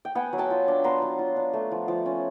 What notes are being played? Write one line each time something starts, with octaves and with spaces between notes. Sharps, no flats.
G5
B3 F#5 G#5
F#3
G5 A5
F4
D4
B3 A#5 C6
F#3
F4
D4
A3
F3
F3
C#4